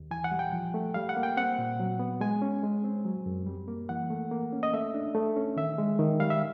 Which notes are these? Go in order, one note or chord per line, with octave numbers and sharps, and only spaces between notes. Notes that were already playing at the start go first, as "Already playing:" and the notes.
Already playing: D#2
E3 G#5
F#5
G3
G5
F3
A3
G3 F5
F#5
A#3
G5
C4 F#5
A#2
F#3
B3
G#3 G#5
C#4
G#3
C4
F#3
F#2
G3
A#3
E3 F#5
A3
A#3
C#4
D#5
A3 E5
D4
A3
C#4
D#3 E5
G#3
D#3
G3 F5
E5